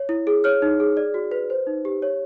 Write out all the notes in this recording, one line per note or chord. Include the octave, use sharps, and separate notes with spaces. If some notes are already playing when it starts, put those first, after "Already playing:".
Already playing: C#5
E4
G#4
C#5 F6
D#4
G#4
D5
F#4
B4
C5
D#4
G4
C#5